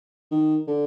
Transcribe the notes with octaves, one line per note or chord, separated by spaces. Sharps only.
D#3
D3